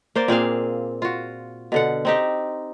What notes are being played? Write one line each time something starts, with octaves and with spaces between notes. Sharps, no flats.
A#3 C5 D5
A#2 C4 G#4 F5
F4 F#4
B2 D3 F#5
C4 D#4 G4